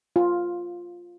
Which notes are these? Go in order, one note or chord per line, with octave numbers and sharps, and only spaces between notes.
F4